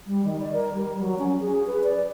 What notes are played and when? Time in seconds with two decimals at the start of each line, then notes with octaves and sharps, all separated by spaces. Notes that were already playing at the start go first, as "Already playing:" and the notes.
0.07 G3
0.25 D#3
0.40 D5
0.53 A#4
0.74 G3
0.99 F#3
1.19 C#4
1.40 G#4
1.67 B4
1.84 D5